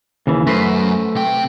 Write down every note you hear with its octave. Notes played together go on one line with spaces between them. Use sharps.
D#2 C#3 E3
F#2 A3 B4 C5
C3 G5